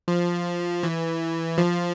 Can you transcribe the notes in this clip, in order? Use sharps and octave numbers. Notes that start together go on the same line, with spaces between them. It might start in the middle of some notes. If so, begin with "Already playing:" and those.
F3
E3
F3